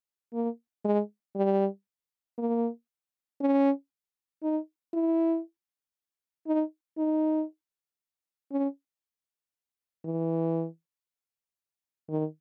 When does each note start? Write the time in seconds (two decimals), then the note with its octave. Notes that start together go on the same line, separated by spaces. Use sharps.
0.33 A#3
0.84 G#3
1.35 G3
2.38 A#3
3.40 C#4
4.42 D#4
4.93 E4
6.47 D#4
6.97 D#4
8.51 C#4
10.04 E3
12.09 D#3